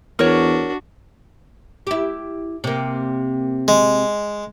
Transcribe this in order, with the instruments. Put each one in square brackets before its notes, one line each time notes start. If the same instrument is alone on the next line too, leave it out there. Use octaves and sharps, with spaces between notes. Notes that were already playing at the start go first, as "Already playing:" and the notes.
[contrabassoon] E2 [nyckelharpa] D4 F#4 [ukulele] A#4 C#5
[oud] E4 G4
C3 A#3
[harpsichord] G#3